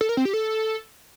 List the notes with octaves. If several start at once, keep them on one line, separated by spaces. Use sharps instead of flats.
A4
A#4
C4
G4
A4